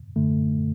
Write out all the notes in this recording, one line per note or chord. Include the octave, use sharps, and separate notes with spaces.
F#2 D3 A3